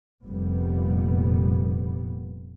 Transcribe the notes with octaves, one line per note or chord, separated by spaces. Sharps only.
F1 A#2 G3 B3